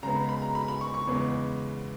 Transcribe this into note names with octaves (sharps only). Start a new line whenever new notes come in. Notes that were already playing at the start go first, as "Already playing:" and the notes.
C#3 G#3 B3 A#5
B5
B5
A#5
B5
B5
C#6
C#6
E2 C#3 G#3 B3